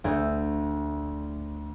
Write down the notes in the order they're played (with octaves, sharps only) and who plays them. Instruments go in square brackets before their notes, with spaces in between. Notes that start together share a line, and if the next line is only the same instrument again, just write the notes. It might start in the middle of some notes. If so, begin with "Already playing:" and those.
[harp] D2 A3 G6 G#6